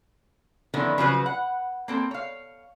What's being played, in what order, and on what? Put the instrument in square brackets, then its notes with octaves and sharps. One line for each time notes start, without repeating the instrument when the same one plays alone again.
[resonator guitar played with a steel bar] D3 D#3 F3 B3 C#4 E4
C#3 F3 F#3 B4
F#5
A#3 C4 A4
C#5 F5